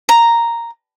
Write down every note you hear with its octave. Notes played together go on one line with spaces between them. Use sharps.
A#5